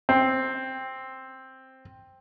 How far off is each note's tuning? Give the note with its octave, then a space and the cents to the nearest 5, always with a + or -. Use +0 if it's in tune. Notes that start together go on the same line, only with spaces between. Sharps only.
C4 +5